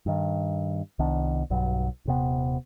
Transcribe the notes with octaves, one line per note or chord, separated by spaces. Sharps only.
G2 D#3
C2 D#3 B3 D4
B1 G2 F#3
D#1 C3 B3